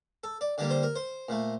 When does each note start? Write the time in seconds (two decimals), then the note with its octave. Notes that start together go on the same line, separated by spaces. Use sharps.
0.24 A4
0.41 D5
0.58 D3 G3 A#3 D5
0.70 C5
0.83 A#4
0.96 C5
1.29 A#2 A3